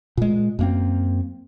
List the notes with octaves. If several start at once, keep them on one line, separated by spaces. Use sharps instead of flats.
A#2 G#3
F#2 A#3 C4